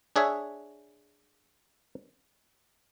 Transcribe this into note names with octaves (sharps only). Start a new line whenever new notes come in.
D4 G#4 C#5 E5